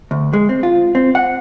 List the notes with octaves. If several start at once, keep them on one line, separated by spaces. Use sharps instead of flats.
D2
G#3
C4
F4
C4
F#5